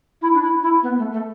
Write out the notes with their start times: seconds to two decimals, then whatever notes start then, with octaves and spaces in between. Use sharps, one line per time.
0.22 E4
0.34 D4
0.42 E4
0.62 E4
0.83 B3
0.98 A3
1.12 A3